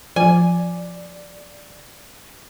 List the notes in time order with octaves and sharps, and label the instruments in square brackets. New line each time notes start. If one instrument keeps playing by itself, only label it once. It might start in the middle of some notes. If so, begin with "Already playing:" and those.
[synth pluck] F3 [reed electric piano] D5 [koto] G#5